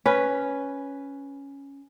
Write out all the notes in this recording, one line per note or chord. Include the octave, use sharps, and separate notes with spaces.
C#4 B4